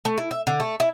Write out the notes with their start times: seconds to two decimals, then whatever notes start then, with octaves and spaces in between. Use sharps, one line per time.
0.05 A3
0.18 E4
0.31 E5
0.47 D3
0.60 A3
0.80 E4